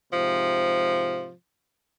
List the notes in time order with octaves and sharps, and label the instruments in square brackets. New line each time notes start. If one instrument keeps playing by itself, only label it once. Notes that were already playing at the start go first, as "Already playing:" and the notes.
[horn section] G#2 C3 F3